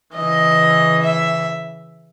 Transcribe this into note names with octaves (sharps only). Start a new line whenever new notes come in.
C#3 E3 D#5
E5